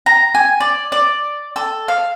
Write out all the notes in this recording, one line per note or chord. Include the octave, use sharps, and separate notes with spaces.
A#5
G#5
D5
D5
A4
F5